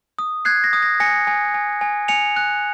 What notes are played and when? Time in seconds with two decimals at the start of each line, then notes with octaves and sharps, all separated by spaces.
0.19 D#6
0.45 F#6 G#6 C7
0.64 A#6
0.73 D#6
0.82 A#6
1.00 G#5 A#6 C#7
1.27 G#5
1.54 G#5
1.81 G#5
2.08 G#5 C#7 F7
2.36 F#6